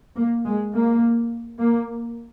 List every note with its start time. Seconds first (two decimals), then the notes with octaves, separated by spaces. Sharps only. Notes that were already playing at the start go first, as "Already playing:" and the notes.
0.16 A#3
0.45 G#3
0.73 A#3
1.59 A#3